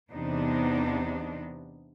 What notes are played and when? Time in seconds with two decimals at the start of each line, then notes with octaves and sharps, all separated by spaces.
0.12 E2 C3 B3 D4 D#4